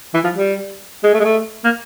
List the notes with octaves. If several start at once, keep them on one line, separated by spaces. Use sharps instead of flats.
E3
F3
G3
G#3
A3
G#3
A3
A#3